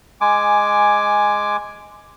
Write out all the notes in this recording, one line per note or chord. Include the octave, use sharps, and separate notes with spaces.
G#3 G#5 D6